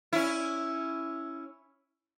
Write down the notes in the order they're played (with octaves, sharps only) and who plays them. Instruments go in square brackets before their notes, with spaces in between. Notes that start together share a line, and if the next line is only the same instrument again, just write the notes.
[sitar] C#4 E4